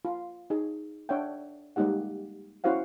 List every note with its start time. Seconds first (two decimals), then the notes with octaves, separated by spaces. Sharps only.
0.05 F4
0.50 D#4 G#4
1.09 D4 C#5 E5 F#5 G5
1.76 G3 G#3 A#3 D#4 G4 F#5
2.64 C#4 E4 F#4 C5 F5 F#5